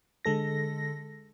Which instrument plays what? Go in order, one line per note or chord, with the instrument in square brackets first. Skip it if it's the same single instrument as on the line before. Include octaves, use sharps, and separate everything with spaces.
[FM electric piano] D3 G#3 A4 A#6